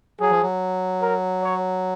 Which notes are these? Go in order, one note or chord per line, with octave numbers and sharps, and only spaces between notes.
F#3 G#4
F3
F#3
A#4
C#5